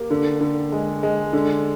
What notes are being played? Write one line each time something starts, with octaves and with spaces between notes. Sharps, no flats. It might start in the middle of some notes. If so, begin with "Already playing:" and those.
Already playing: A#3 G4
D3
D3
G#3
G#3
D3